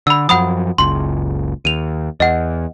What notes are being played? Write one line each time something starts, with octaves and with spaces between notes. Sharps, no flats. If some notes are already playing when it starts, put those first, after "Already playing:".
D3 B5 E6
F#2 F3 F#5 B5 D#6
F#1 C#2 C6
D#2 D#7 F7
E2 D#5 F#5